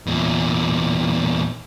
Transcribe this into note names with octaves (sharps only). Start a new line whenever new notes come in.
E2 A#2